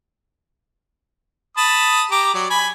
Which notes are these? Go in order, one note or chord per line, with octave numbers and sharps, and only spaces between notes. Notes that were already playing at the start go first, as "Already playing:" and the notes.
A5 B5 D#6
G4 A#5 D6
F#3 D5
G#5 B5